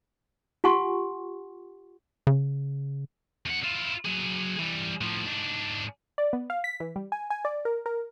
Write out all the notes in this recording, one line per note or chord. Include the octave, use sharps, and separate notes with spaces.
F4 G4 F#5 G#5 C6 C#6
C#3
E2 F#5
E4 F4
F#3 G#4
E3 G3
A2 F3
G#2 D4
D5
B3
F5
B6
E3
G3
G#5
G#5
D5
A#4
A#4